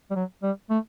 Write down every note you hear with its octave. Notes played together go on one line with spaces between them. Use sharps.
G3
F#3
G3
A3